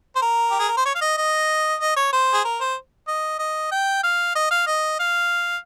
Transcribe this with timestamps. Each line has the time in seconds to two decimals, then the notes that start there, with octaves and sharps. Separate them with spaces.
0.16 C5
0.22 A#4
0.51 G4
0.60 G#4
0.68 A#4
0.77 C5
0.85 C#5
0.95 F5
1.01 D#5
1.17 D#5
1.80 D#5
1.96 C#5
2.13 C5
2.34 G#4
2.45 A#4
2.61 C5
3.08 D#5
3.39 D#5
3.72 G5
4.03 F5
4.35 D#5
4.51 F5
4.67 D#5
4.99 F5